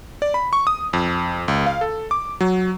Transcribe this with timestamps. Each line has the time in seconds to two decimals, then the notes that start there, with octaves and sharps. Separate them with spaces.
0.22 D5
0.34 B5
0.53 C#6
0.67 D#6
0.93 F2
1.48 C#2
1.66 F5
1.81 A4
2.11 D6
2.41 F#3